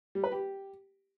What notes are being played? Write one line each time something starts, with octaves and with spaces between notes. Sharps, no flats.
G3
B4
G4